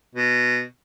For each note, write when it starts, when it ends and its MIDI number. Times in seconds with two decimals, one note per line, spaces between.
0.15 0.63 47